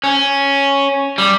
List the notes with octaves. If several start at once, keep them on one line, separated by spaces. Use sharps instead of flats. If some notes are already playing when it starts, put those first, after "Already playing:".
C#4
G3